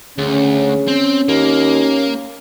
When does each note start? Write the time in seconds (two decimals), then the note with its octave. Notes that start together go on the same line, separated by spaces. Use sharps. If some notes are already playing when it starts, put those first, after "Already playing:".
0.18 D2 C#3 C#4
0.88 C4
1.28 D#2 A#3